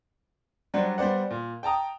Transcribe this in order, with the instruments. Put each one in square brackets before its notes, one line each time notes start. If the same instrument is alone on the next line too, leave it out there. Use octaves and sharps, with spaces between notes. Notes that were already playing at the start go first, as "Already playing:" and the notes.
[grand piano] F#3 G3 D4 C5 F#5
G3 B3 C5 D5 F#5
A#2
G5 A5 A#5 D#6